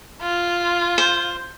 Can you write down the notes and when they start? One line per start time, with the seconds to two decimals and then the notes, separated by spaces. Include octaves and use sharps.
0.22 F4
0.98 C5